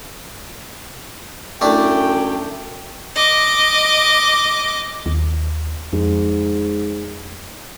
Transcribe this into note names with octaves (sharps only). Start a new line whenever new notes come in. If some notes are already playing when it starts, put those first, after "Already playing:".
F#2 A3 D4 E4 G5
D#5 D6
D#2
F2 G#2